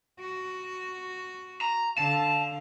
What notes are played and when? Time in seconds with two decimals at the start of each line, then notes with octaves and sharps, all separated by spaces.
0.20 F#4
1.61 A#5
1.98 D3 F5 A5